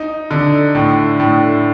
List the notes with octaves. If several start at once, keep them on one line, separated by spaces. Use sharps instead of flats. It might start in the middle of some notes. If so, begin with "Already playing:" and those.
Already playing: D#4
D3
A2
A2